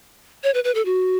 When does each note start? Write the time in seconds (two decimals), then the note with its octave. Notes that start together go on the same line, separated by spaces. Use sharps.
0.44 C#5
0.54 B4
0.64 B4
0.75 A4
0.85 F#4